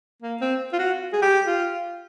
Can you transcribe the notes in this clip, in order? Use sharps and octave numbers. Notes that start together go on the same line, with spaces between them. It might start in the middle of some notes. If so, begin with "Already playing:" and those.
A#3
C4
F4
F#4
G#4
G4
F4